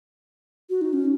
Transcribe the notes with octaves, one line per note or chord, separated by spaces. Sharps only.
F#4
D#4
C#4